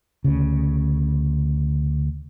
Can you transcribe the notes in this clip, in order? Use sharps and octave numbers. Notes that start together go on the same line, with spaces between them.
D2 C#3